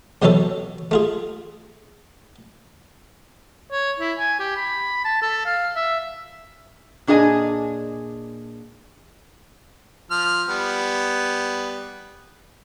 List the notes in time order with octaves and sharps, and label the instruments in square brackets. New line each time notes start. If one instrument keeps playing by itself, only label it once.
[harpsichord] C2 B2 E3 F#3 C#4 A4
A3 F4 G#4
[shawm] C#5
E4
G#5
G4
B5
A5
A4
F5
E5
[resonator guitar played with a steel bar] A#2 D4 G#4 D#5 G#5
[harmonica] F3 F6
G3 B3